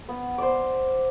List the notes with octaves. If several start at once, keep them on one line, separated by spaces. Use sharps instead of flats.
B3
C5 D5